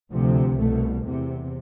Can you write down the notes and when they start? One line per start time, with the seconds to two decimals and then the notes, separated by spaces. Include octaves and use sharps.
0.13 D2 C3 F3
0.59 C2 B2 A3
1.06 E2 C3